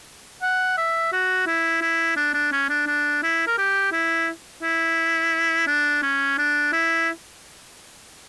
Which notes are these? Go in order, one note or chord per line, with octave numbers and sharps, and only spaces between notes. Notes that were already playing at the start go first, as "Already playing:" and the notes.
F#5
E5
F#4
E4
E4
D4
D4
C#4
D4
D4
E4
A#4
G4
E4
E4
D4
C#4
D4
E4